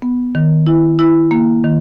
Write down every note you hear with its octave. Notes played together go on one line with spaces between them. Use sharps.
B3
D#3
E4
E4
A#3
D#3